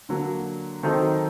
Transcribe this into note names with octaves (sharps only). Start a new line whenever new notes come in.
D3 F#3 A#3
D#3 F#3 C4 D#4 A4